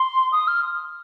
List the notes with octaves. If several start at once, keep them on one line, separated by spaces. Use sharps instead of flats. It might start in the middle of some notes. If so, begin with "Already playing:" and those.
Already playing: C6
D#6
F6